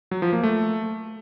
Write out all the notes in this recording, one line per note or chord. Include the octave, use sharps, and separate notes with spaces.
F#3
F3
A#3
A3